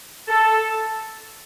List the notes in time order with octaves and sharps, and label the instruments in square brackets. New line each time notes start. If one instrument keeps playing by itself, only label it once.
[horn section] A4